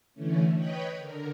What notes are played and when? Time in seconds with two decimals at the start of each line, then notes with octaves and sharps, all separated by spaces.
0.14 D3 E3 A3 C#4
0.54 B4 C#5 D#5 G5 B5
0.96 D3 A#4